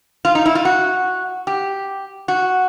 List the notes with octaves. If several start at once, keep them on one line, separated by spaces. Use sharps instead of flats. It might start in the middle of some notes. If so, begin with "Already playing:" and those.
F4
D#4
E4
F4
F#4
G4
F#4